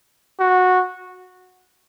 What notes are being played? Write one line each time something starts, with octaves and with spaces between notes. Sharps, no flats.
F#4